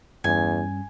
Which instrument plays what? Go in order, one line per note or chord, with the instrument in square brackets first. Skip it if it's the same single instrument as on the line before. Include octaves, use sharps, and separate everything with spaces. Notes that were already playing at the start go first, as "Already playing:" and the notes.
[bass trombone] E2 [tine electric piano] G2 G3 C#4 [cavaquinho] G#5